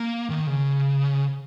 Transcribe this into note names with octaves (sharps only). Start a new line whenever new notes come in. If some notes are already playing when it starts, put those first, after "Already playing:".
Already playing: A#3
D#3
C#3